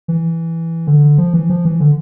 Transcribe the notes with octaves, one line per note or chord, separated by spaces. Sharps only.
E3
D3
F3
E3
F3
E3
D3